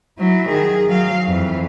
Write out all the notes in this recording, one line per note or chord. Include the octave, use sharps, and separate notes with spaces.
F#3 E4
D#3 G#4
F#3 F5
F2 E3